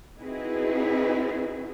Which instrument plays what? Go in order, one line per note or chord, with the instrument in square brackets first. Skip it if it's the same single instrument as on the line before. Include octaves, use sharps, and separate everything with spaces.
[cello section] C4 D#4 E4 F#4 G#4 B4